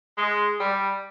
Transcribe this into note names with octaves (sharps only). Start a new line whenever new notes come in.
G#3
G3